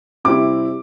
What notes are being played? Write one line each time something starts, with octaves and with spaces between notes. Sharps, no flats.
C3 G3 C4 E4 D6